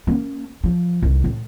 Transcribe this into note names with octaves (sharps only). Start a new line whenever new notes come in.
A#3 C#4
F3
C2 D#3
A2